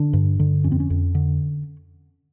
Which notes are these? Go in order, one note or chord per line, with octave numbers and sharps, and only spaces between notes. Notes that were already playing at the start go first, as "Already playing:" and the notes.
Already playing: D3 D4
G2
D3
F2 C#4
C4
C#4
F2
D3